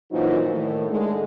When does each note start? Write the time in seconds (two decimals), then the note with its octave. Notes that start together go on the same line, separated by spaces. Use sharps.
0.11 F#2 A#2 E3 F3 D#4 F#4
0.50 A2 D#3
0.90 D3 G#3 A3